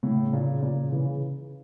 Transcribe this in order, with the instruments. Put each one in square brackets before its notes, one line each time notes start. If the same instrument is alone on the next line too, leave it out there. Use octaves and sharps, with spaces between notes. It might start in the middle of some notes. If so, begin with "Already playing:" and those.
[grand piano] A2 [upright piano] C#3
[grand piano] A#2 [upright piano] C#3
[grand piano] A#2 [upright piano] C#3
[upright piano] C#3 [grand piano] E3